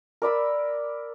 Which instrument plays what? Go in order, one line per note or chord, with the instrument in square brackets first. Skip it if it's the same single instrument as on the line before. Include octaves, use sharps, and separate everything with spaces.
[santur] A#4 D5 B5 E6